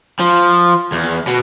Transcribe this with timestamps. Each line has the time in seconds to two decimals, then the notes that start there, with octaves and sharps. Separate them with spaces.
0.19 F3
0.92 E2
1.27 B2